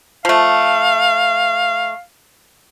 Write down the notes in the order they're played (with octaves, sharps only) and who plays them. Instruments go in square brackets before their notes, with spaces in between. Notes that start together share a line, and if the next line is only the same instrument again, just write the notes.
[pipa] F3 A3 [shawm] F5